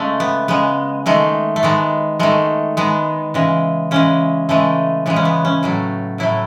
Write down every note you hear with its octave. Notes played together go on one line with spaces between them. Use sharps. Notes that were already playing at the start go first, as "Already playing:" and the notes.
Already playing: C#3 G#3 A3
B3
C#3 G#3 B3
D#3 G#3 A3
A3
D#3 G#3 B3
D#3 G#3 A3
D#3 G#3 B3
C#3 E3 G#3
C#3 E3 G#3 C#4
C#3 E3 G#3 A3
C#3 E3 G#3 B3
C#4
B3
C#4
A2 F#3 A3
A2 F#3 A3 E4